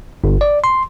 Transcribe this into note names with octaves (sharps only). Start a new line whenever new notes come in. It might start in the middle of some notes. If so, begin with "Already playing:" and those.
G1
D5
C6